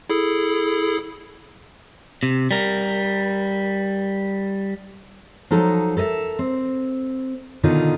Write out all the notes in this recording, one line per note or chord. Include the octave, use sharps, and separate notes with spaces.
E4 G#4 A4
C3
G3 A#4
F3 F#3 D#4 A4
A4 A#4 D#5 E5
C4
B2 D3 D#3 D#4 F4